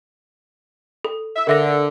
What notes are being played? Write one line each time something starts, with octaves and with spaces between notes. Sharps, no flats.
A4
E5
D3 A#4 E5 A#6